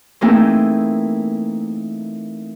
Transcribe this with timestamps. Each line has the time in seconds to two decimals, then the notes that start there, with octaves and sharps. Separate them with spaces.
0.21 E3 A3 A#3 C4 D#4 G#4